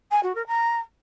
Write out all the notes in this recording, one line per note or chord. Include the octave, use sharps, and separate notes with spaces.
G#5
F#4
A#4
A#5